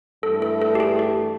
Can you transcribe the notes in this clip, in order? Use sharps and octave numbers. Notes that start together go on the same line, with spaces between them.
G2 E3 A3 A4
A4
A4
G4
G#4
G4